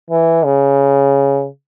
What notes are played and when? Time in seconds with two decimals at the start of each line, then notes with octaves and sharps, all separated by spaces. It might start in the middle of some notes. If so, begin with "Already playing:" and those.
0.10 E3
0.45 C#3